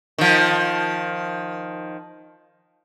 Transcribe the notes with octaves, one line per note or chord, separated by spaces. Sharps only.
D#3 F3